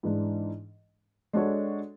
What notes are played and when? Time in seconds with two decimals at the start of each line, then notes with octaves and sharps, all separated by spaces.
0.03 G#2 E3 G#3 D4
1.33 G#3 D4 F#4 A4 C#5